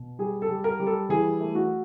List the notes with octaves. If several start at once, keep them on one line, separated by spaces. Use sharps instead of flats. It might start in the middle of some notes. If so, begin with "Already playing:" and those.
Already playing: B2
G3 G#4
A4
G3
A#4
G3
A4
E3 G#4
A3
F#4